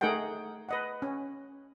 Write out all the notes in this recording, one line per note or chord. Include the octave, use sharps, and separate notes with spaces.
A3 D#4 G#4 A#4 F#5 G5
B4 D#5 F#5
C#4